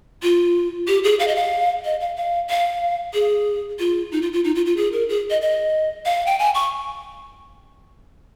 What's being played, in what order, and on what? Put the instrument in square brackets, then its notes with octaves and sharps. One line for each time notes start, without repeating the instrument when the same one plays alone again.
[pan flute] F4
G4
G#4
F5
D#5
F5
D#5
F5
F5
F5
G#4
F4
D#4
F4
F4
D#4
F4
F4
G#4
A#4
G#4
D#5
D#5
F5
G5
G#5
C#6